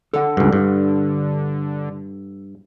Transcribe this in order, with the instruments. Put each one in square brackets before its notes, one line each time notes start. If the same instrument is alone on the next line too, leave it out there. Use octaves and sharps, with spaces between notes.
[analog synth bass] D3 [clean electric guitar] A4 F#5
[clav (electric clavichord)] C#2 G2
G2